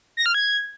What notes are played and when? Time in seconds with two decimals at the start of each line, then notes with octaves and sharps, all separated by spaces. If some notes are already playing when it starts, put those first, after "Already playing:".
0.17 A#6
0.26 F6
0.34 G#6